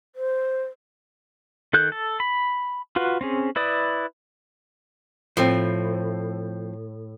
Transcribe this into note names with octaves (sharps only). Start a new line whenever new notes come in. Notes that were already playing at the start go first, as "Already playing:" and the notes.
C5
D#3 A4 F#6 G6
A4
B5
F4 F#4 B4
C4 C#4 G#4
E4 B4 D5 D#6
A2 F3 C4